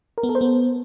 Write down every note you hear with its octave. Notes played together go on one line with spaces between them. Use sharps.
A#4
B3
A4
C5
B3